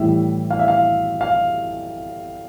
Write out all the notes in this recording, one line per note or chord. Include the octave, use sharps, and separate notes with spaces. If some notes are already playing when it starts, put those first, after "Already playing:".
Already playing: A2 E3 G3 E5
F5
E5
F5
F5